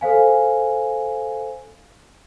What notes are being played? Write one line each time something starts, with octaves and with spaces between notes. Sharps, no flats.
A4 C5 F5 G#5